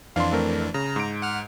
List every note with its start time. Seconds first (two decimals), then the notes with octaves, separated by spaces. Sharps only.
0.16 F2 E3 D4 F5 C6
0.32 A3 C4 A#4
0.74 C#3 A#5
0.96 G#2 D7
1.22 F#5 F6